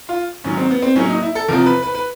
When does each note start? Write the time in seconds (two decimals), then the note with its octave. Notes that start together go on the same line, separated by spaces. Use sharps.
0.09 F4
0.44 G#2 D#3 F#3 C#4
0.57 C4
0.70 B3
0.82 C4
0.96 A2 F#3 A#3 C#4
1.09 D#4
1.22 E4
1.35 A4
1.48 E2 C3 F3 A#4
1.66 B4
1.83 B4
1.95 B4